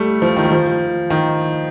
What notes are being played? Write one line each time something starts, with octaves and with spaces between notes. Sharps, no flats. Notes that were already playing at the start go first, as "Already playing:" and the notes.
Already playing: G3 A3
F3
D#3
G3
F3
D#3